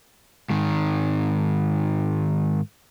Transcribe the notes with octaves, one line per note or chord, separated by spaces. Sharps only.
G#2 D#3